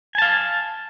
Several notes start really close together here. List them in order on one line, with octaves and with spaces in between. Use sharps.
G#5 A5 F5